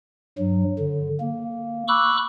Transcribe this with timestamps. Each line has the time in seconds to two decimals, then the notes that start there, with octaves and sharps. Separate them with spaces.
0.38 G2 F#3
0.79 D3
1.20 A#3
1.88 B5 C#6 D6 E6 F#6